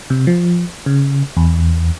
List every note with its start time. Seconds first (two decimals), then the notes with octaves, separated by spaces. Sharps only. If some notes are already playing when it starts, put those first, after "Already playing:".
0.10 C3
0.27 F3
0.86 C#3
1.37 E2